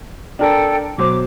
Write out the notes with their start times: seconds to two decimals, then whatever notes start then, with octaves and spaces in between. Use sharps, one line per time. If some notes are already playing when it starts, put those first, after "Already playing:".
0.39 D4 A4 A#4 D5 G5
0.98 B2 F#3 C5 D6